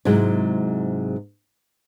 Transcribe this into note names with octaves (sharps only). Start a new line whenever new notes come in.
G#2 C3 F#3 G#3 E4